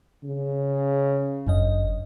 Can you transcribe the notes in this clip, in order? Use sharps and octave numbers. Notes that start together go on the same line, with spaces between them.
C#3
G1 F#2 D#5